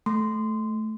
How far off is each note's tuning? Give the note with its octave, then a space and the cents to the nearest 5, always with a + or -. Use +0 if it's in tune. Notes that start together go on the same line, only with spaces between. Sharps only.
A3 -10 C6 -15